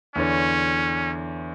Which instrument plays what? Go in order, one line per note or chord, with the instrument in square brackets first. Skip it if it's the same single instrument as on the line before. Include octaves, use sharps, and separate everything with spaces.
[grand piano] E2 D3 C#5 [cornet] C#4